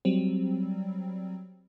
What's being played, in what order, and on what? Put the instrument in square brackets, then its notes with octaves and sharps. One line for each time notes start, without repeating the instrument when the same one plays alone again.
[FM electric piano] F#3 G3 C4